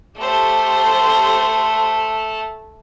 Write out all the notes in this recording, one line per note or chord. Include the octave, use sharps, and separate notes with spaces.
A3 G4 A4 C5